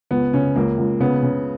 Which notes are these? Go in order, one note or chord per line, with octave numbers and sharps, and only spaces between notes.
C#2 B3
C#3 C#4
C#2 A#3
C#2
C#3 B3
C#3